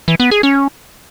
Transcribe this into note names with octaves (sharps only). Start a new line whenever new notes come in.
E3
B3
G#4
C#4